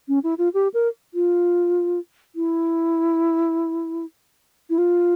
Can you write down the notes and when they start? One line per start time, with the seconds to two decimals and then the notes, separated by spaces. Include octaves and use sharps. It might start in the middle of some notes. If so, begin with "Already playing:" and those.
0.08 C#4
0.23 E4
0.38 F4
0.54 G4
0.74 A#4
1.14 F4
2.35 E4
4.70 E4
4.78 F4